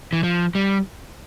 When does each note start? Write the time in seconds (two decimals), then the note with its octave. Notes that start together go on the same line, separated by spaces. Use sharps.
0.13 E3
0.23 F3
0.55 G3